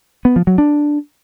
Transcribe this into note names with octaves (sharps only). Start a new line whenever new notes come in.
B3
F3
F#3
D4